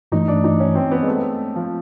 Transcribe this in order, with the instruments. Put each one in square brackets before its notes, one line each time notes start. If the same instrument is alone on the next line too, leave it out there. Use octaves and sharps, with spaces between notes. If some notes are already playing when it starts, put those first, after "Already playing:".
[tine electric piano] G2 E3 A3 [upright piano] D#4
[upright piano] D4
D#4
C#4
C4
B3
G#3
A3
F3